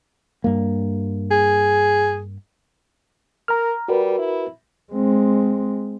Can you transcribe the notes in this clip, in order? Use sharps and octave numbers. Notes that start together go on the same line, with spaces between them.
G2 A#3
G#4
A#4 A#5 F6
G3 F#4 A#4 B4
E4
G#3 C4